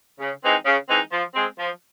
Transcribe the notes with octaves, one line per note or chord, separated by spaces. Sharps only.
C#3
E3 G#3 C4 D#4
C#3
E3 G#3 C4 D#4
F3
G#3 C4
F3